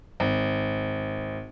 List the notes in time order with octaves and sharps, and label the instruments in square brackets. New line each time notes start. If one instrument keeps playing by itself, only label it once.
[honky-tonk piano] G#1